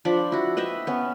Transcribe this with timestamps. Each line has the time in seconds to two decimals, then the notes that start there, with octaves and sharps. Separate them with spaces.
0.05 F3 D4 B5 D6
0.32 E4 F#4
0.57 B4 D#5 E5 G5
0.87 B3 C#4